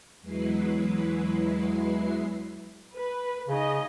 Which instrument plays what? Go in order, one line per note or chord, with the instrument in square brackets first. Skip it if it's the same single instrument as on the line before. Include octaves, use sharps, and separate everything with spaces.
[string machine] E2 F#3 G#3 E4 B4 C7
[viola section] B4
[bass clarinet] C#3 [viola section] D#4 D#5